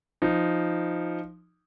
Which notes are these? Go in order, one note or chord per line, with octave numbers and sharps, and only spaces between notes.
F3 D#4